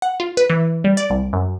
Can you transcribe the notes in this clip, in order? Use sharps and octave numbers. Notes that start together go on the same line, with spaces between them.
F#5
F4
B4
E3
G3
D5
C2
F#2